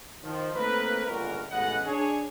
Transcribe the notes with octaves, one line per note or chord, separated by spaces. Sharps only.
D#3 F3
A3 A#3 C4 D#4 A#4 B4
G1 C#2 A#2 F#4 A#4
A1 C#3 G#3 B3 D#5 F#5
D4 G#4 C#5